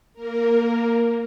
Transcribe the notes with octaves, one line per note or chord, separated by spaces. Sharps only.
A#3 A#4